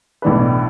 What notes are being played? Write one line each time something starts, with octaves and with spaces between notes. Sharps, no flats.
B1 A2 E3 D4 B4